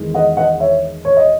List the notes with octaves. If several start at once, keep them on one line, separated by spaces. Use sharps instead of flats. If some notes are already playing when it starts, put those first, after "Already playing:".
Already playing: E2 D#3 G#3
D#5 F#5
D#5 F#5
C#5 E5
C#5
D#5